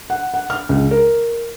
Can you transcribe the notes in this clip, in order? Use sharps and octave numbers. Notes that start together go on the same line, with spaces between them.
F#5
F#5
F6
C#2
A#4